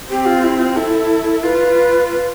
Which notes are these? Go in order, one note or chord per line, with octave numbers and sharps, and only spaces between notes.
C4 G4
F4
E4
F4
E4 A4
F4 B4
B4